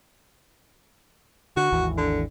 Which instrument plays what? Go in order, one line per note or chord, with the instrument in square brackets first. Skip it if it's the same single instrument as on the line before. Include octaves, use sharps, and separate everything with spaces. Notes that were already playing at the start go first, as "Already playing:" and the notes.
[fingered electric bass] D3 [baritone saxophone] F#4
[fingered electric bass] G#1 D#2 E3
[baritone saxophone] D3